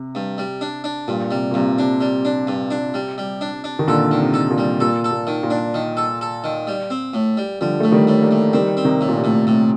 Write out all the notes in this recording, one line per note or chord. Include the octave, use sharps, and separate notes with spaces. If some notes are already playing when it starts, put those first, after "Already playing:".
Already playing: C3
G2
G3
D4
D4
G2 A#2
C3 G3
A#2
G2 C3
C3 D4
G3
D4
G2
D4
G3
G3
D4
D4
D#3
A#2 D3 A4
D#3
C3
A4
A#2
G3
A#2 A4
A4
A#2
D#3
A#2
D4
D#3
A4
A4
D#3
G3
C4
A2
G3
D3 F3 G3
A2 A3
D#3 G3
A2
G3 A#3
A2
D#3 G3 C4
C4
C3 D#3
A2
A#2
C3
A2
A2 C3